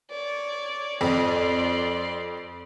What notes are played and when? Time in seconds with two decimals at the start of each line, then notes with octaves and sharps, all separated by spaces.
0.10 C#5 D5
1.01 F2 D5 C6